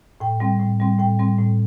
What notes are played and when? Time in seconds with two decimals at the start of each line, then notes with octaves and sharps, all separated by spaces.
0.20 A2 G5
0.40 G3 C4
0.60 A2
0.80 G3 C4
0.99 A2 G5
1.19 G3 C4
1.39 A2